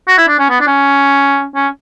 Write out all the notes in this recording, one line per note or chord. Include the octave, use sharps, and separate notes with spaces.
F#4
E4
D4
C#4
B3
D4
C#4
C#4